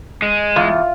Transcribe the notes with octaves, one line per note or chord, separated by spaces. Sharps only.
G#3
E2 F4